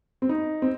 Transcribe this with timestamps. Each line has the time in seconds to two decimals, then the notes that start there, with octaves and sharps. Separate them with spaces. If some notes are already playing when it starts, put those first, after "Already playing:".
0.22 C4
0.29 D#4
0.62 C4